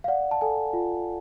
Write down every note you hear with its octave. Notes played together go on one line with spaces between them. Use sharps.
F5
D5 F#5
A5
A4 G#5
F4